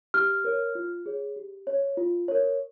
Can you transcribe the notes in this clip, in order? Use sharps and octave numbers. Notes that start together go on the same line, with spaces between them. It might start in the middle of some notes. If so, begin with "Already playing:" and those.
G4 F6
A#4 C#5
F4
G#4 C#5
G4
C#5
F4
A#4 C#5